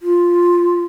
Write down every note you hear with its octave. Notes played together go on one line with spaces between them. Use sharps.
F4